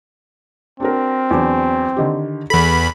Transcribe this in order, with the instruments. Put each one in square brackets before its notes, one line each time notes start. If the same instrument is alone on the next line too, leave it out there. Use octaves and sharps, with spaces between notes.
[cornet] C4 [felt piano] D4 F#4 A#4
[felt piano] E2 F#3 D4
D3 D#3 G4
[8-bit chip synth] E2 B5 [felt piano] A4